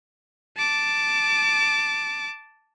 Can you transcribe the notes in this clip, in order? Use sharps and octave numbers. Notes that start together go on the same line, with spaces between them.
A5 D6